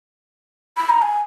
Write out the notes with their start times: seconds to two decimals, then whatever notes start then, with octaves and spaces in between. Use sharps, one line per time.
0.77 B5
0.89 A#5
1.02 G#5